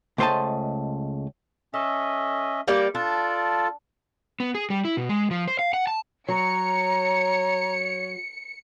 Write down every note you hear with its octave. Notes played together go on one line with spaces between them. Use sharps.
C#2 A3 C5 D5 D#5 A5
C#4 A4 D#5 E5
G3 A#3 D5
D4 F4 A4
B3
G#4
G3
E4
B2
G#3
F3
C5
F5
F#5
A5
F#3 C#5 A#5 C#7